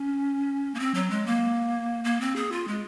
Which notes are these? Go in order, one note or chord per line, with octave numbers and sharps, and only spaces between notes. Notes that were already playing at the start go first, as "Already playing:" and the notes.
Already playing: C#4
A#3
C4
F#3
G#3
A#3
A#3
C4
G#4
F4
G#3